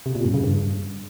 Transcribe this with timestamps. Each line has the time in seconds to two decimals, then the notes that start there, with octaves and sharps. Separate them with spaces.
0.06 C3
0.15 A#2
0.25 F#2
0.34 C#3
0.43 G2